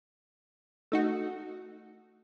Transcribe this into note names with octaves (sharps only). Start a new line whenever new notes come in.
A3 D#4 F#4